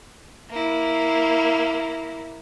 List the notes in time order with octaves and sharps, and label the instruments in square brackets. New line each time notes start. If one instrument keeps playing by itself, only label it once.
[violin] A#3 E4